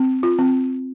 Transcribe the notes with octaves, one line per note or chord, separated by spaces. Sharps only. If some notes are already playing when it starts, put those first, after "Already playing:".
Already playing: C4
F4
C4